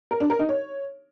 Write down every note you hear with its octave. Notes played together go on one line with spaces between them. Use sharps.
A#4
D4
A#4
D#4
C#5